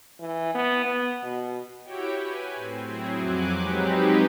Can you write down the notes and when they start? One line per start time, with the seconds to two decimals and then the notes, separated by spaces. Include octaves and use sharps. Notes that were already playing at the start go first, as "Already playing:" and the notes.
0.20 E3
0.54 B3
0.85 B3
1.23 B2
1.83 E4 F#4 G4 C#5 G5
2.21 B4 G#5
2.55 A2 C4
2.85 F#3 C4 E4 G#4
3.16 F2 F#3 G#5 D6 F#6
3.57 F#3 G#3 C4 D#4 G4 B4